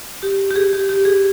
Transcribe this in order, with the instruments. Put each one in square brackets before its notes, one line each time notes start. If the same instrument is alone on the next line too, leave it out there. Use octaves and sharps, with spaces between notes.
[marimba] G4
G4
G#4
G4
G4
G#4